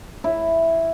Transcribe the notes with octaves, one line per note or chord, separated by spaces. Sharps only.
E4